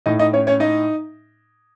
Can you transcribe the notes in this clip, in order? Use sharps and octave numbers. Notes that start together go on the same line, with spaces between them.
A2 D#4 D#5
D#4 D#5
C#4 C#5
C#4 C#5
D#4 D#5